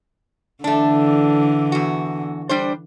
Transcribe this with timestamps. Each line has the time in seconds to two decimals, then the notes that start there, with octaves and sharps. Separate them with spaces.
0.64 D3 E3 A3 D4
1.72 E2 F#4
2.49 G3 D4 C5